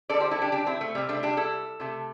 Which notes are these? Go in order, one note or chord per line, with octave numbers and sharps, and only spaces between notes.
D3 G3 A4 D5
G4 C5
E4 A4
D4 G4
D4 G4
C4 E4
A3
C3 G3 C4
A3 D4
D4 G4
E4 A4
C3 A3